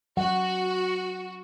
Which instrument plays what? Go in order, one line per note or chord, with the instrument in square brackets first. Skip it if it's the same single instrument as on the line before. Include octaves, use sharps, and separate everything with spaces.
[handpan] F#3 F#5 [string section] F#4